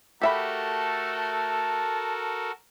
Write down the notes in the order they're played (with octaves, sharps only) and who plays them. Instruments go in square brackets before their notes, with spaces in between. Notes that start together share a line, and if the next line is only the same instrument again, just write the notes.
[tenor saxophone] A3 [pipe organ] F#4 A4 A#4 [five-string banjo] G4 E5 B5 [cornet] A5